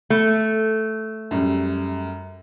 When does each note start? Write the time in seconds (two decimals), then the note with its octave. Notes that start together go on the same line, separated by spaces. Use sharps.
0.10 A3
1.31 F#2 G3